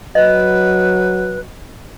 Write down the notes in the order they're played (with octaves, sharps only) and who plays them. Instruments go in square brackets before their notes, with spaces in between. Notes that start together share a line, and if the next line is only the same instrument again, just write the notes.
[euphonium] F#3 [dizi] B4 [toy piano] D#5